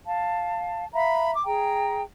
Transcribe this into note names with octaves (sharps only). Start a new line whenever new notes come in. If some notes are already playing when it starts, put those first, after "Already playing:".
F5 A5
E5 F5 A#5 B5
D6
G#4 G5 A#5